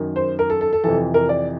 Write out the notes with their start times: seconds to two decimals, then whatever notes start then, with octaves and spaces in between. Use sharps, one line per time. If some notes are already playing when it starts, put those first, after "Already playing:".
Already playing: F#2 D#3
0.16 C5
0.39 A#4
0.50 A4
0.61 A4
0.73 A4
0.84 F2 C3 E3 A4
1.14 A#4
1.29 D5